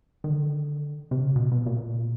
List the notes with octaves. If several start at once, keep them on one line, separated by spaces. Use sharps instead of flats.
D#3
D3
C3
C#3
B2
B2
A#2